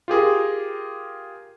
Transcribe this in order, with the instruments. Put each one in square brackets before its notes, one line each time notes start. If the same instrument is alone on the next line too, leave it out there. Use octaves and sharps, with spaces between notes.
[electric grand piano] F4 G4 G#4 A#4